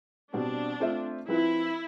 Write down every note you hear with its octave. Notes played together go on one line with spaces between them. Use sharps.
B2 G3 C4 D4
A3 C4 F4 C5 E5
F3 C4 E4 F4 B4